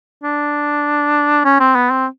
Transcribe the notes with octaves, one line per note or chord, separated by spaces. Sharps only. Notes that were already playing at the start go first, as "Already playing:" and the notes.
D4
C#4
C4
B3
C4